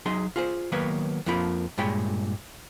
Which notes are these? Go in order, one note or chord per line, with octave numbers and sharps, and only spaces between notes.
F#3 D#4 G#4 C6
F4 G#4 C5
D#3 F#3 A#3 B3 B4 C#5
F2 F3 A#3 F4 B5
G2 A#2 G#3 C#5 G5 B5